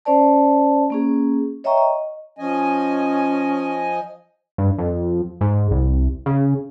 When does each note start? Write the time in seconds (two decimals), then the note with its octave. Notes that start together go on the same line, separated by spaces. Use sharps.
0.05 C#4 C5 D5 A5
0.90 A#3 C#4 G#4
1.64 C#5 D#5 E5 G5 A#5 C#6
1.78 D#5
2.39 F3 C#4 D#5 G#5
4.58 G2
4.78 F2
5.41 G#2
5.71 C2
6.26 C#3